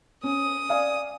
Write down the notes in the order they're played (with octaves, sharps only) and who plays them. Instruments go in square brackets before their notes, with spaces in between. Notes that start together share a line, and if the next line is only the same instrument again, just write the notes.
[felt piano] C#4 [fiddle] D#6
[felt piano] D5 F5 G#5